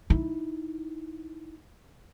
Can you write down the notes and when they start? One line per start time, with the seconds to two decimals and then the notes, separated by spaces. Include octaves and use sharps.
0.10 D#4 E4